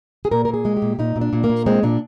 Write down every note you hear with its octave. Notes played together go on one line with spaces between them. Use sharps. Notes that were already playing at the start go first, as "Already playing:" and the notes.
G#4
A#2 A#4
A#4
A#2
G#4
G#3
G4
A#2
A#2 D#4
A#2
D4
A#2
A#3
A#2
G#3 C4
A#2 D4